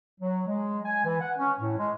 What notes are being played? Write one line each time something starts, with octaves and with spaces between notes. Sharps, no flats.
F#3
G#3
G#5
E3
F#5
C#4
A2
G#3